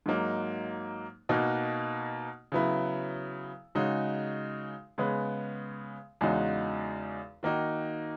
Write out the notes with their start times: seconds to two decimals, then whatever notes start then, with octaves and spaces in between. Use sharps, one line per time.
0.06 G#2 F#3 A#3 D#4
1.29 B2 A#3 D#4 F#4
2.52 C#3 F#3 B3 E4
3.75 C#3 G#3 D#4 F#4
4.98 C#3 G#3 B3
6.21 E2 C#3 G#3 D#4 F#4
7.43 D#3 A#3 D#4 F#4